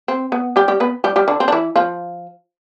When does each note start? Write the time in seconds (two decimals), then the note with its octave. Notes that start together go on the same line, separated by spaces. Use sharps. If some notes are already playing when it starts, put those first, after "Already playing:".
0.08 C4
0.32 B3
0.56 G3 G4
0.68 G3 G4
0.80 B3 B4
1.04 G3 G4
1.16 G3 G4
1.28 D3 D4
1.40 C4
1.48 D4
1.52 E3 E4
1.76 F3 F4